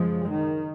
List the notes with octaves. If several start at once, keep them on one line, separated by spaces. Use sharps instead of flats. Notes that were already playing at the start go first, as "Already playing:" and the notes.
Already playing: F#2 C#3 F3 G#3
D#3